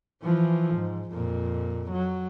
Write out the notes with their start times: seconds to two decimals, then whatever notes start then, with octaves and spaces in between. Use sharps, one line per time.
0.23 E3 F3
0.75 G#2
1.12 F2 A#2
1.91 F#3